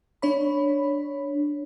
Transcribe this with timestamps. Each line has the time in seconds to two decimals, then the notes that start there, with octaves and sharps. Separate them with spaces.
0.22 D4 C#5 B5